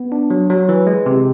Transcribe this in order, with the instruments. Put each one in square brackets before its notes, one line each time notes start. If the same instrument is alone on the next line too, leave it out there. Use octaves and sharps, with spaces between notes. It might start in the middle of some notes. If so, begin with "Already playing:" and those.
Already playing: [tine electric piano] B3
D4
F#3
F#3
E3
G#3
C3